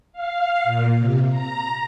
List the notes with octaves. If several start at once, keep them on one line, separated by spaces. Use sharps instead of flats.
F5
A#2
C3
A#5